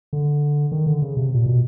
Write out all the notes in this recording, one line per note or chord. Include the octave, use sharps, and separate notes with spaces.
D3
D#3
D3
C#3
C3
A#2
B2